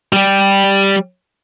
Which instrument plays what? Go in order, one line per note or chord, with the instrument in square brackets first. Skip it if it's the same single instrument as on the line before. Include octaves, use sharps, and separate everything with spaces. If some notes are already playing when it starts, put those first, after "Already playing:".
[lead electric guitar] G3 G4